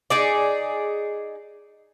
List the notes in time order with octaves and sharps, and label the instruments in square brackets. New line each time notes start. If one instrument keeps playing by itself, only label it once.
[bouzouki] D#4 G#4 D5